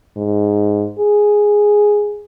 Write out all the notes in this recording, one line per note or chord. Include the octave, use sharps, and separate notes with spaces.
G#2
G#4